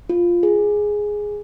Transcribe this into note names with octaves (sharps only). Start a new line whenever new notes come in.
F4
G#4